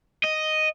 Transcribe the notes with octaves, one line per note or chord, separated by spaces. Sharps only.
D#5